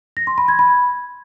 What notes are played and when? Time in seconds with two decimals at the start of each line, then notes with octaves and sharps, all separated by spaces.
0.17 A#6
0.27 C6
0.38 B5
0.48 G#6
0.59 B5